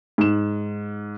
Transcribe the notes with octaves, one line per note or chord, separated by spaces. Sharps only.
G#2 E7